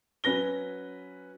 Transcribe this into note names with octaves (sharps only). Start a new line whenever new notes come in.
F#3 C#4 B4 A#6 G7